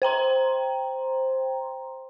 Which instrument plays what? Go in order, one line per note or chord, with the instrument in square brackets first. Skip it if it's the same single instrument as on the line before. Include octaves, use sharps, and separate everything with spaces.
[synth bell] C5 G5 A#5 C6